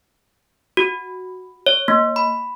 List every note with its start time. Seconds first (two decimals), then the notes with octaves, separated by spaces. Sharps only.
0.77 F#4
1.66 C#5
1.88 A#3
2.16 B5